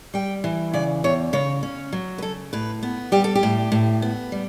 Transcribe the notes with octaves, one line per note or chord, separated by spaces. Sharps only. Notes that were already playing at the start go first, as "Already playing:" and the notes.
G3 G5
E3
C#3 D5
E2 C#5
C#3 C#5
C#4
F#3
B4
C#3 A4
A2 B4
B3
G3 G4
A4
G4
A2
A2
B3
G3